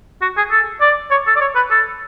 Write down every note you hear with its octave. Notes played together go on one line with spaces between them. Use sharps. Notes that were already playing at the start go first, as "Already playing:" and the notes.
F#4
G#4
A4
D5
C#5
A4
D5
C#5
B4
A4